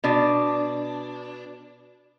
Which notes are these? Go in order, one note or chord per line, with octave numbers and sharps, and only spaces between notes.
B2 D4